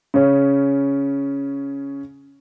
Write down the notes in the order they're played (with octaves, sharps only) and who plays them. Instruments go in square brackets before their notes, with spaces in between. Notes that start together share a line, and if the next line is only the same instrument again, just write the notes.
[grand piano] C#3 C#4